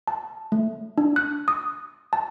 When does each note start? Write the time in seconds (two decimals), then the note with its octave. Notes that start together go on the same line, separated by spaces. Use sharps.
0.07 A5
0.52 A3
0.98 D4
1.16 F#6
1.48 D#6
2.13 A5